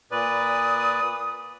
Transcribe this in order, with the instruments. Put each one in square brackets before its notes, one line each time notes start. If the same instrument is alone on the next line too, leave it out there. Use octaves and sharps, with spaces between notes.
[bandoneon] A#2 B4 D5 [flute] D#6